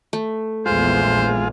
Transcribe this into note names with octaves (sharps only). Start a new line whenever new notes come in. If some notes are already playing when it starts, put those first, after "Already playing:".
A3
A#1 E2 G#3 F4 C5